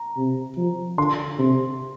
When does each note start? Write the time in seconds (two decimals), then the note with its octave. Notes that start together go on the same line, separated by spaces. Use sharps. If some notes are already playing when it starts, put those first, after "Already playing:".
Already playing: A#5
0.17 C3
0.58 F3
0.98 D3 C6
1.39 C3